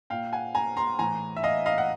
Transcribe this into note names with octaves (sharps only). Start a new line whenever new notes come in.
A#2 F5 G5
F#5 G#5
G#5 A#5
A#5 C6
A2 E3 G#5 A#5
E5
D#5 F5
D#5 F5
F#5